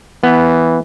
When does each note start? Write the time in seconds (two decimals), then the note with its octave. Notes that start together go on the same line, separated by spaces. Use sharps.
0.23 E3 B3